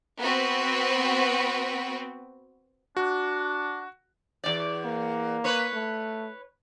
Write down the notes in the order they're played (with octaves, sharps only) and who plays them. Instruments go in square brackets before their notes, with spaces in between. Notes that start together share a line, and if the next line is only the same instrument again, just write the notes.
[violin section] B3 C4 F#4 B4
[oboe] D4 [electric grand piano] F#4
[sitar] E2 D5
[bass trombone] A#3
[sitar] B4 C#5
[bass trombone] A3